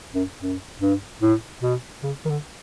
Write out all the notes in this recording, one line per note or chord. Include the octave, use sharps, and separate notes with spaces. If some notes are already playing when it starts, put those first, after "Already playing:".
F#2
F#2
G2
A2
B2
C#3
D#3
D3